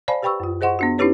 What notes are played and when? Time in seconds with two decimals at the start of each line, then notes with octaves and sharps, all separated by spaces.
0.08 C5 D5 F5 G#5 A5 B5
0.22 G4 B4 G5 B5 C#6 E6
0.40 F#2 F4
0.61 G#4 C5 D#5 F#5 C6 C#6
0.79 B3 D4 F#4
0.98 C#4 D#4 E4 G4 B4 C#5